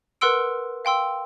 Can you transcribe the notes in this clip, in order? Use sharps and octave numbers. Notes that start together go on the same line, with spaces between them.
A#4 B4 F#5 C6 E6 D7
F5 G5 C6 E6